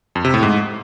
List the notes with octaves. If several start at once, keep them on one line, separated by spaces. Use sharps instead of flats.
F2
C3
A2
G#2